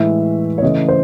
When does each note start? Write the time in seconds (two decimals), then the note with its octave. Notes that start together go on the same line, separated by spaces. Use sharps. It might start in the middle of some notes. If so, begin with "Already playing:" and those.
Already playing: A2 E3 G#3 E5
0.58 C#5
0.62 C#3 E3 A3 D#5
0.89 C5